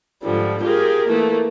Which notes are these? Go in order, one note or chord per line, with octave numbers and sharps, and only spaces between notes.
G#2 D3 F3 G3
F4 G4 G#4 A#4
E3 A3 A#3